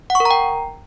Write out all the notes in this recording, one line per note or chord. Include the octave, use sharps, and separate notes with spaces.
F#5
C#6
A#4
A#5
G5